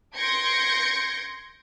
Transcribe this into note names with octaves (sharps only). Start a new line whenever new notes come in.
C6 G6 G#6 A#6 C#7 D7